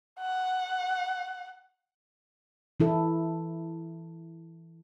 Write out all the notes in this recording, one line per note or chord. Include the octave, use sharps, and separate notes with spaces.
F#5
E3 E4 A4